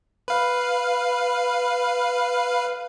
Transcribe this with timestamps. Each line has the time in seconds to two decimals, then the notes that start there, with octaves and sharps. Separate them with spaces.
0.28 B4 F5